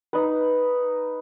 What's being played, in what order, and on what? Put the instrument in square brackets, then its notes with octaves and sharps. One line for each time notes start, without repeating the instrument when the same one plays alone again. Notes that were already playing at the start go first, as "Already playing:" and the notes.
[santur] D#4 B4